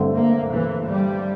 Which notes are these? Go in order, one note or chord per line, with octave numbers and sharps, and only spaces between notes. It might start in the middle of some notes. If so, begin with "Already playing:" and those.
Already playing: G2 D3 A3 C4
A#3
E3
G3